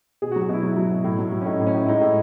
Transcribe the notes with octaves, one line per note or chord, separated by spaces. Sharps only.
B2 G#4
F#4
F#3
F#4
B2 E4
F#3
F#3
B2
A2
F#3
F#3
C#4
A2 D#4
A2
C#4
A2
E4
G#3 D#4
A2